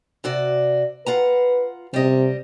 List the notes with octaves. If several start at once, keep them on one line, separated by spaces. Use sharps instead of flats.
C3 F#4 D5
F4 B4 F#5 A#5
C3 G3 D#5